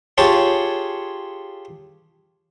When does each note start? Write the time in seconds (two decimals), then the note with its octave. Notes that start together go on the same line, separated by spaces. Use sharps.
0.18 F4 G4 G#4 C#5 A5